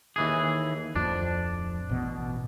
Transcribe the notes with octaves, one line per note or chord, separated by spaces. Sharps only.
D#2 E3 G#4
D1 F2 F3 D4
A1 B2